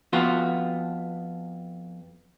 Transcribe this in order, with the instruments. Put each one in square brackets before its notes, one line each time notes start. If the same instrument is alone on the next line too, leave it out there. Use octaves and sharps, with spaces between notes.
[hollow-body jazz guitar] F2 B3 F4 F#4 C6